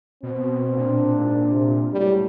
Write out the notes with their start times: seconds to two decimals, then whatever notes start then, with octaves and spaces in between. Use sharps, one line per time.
0.23 B2 C4
0.77 A#2 D4
1.16 G#2
1.50 C3
1.92 C#2 F#2 A2 G3